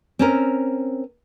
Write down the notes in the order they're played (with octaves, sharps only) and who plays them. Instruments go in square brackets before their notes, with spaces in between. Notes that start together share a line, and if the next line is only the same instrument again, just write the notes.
[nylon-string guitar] C4 C#4 A#4